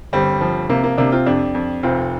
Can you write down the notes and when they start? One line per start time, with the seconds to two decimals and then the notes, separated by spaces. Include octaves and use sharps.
0.13 G1 G3 C4
0.41 F3
0.70 C3 A#3
0.84 A#3
0.98 C3 A#3 D4
1.12 C4 F4
1.26 F2 D4 G4
1.55 F2
1.83 F1 C4 F4